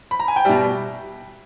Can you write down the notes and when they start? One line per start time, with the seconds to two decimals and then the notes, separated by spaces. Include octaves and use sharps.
0.11 B5
0.20 A#5
0.28 G#5
0.36 G5
0.45 B2 G3 E5